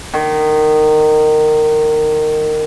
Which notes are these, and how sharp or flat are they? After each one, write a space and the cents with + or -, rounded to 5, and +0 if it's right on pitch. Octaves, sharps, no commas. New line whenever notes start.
D#3 -20